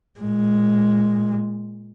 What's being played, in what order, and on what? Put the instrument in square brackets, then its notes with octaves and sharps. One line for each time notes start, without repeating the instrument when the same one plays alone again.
[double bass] A#2 G#3